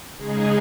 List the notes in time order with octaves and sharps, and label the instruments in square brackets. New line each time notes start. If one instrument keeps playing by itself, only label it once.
[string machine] C#3 G#3 D#4 G#4